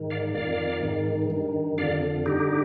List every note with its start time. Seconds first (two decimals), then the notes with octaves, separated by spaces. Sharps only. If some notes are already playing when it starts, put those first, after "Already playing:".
Already playing: G#2 D#3
0.10 D5 F5
0.34 F2 D#3 D5 F5
0.82 G#2 D#3
1.30 G2 D#3
1.78 F2 D3 D5 F5
2.26 G2 D3 D#4 G4